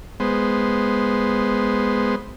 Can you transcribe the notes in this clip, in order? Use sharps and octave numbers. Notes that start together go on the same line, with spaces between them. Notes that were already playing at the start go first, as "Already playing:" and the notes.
G#3 B3 C5